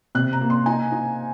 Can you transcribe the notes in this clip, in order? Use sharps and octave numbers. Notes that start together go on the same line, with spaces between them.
C3 F#6
A#5
A#3
C6
D#4 G#5
D#4